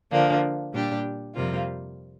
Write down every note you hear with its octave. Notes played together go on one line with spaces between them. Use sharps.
D3 F3 A#3 D4
A#2 G3 D4 G4
F2 C3 G3 A#3 F4